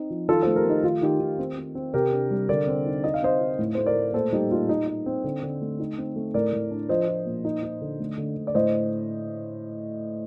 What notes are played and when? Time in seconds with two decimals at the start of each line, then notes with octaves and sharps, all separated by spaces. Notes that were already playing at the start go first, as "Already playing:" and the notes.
Already playing: C4 D#4
0.10 F3
0.29 D#3 F4 A4
0.42 A3 A4 C5
0.56 G4 A#4
0.65 A3 D#4
0.84 D#3 F4
1.02 D#3 D#4 G4
1.20 D#3
1.39 C4
1.57 C4
1.75 C4
1.94 C3 G4 A#4
2.12 D4
2.31 G3
2.49 D3 A#4 D5
2.67 C4
2.86 D#4
3.04 D#4 D#5
3.14 F5
3.22 C4 C5 D#5
3.41 D#4
3.59 A2
3.75 A3 C5
3.86 A#4 D5
3.96 A3
4.14 A#2 A4 C5
4.33 G3 D#4 G4
4.51 A#2 F4
4.69 D#4
4.87 D#4
5.06 C4
5.24 D3
5.43 D3
5.61 A3
5.80 D#4
5.98 C4
6.16 A3
6.34 A2 A#4 D5
6.53 A2
6.71 D4
6.89 F3 C5 D#5
7.08 F3
7.26 A#2
7.45 D#4
7.63 D#4
7.82 D3
8.00 A3
8.18 D3
8.36 D3
8.47 D5
8.55 A2 C5 D#5